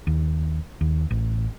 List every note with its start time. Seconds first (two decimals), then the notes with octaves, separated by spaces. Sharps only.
0.07 D#2
0.81 D#2
1.11 A1